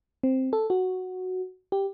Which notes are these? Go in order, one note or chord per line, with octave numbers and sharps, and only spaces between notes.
C4
A4
F#4
G4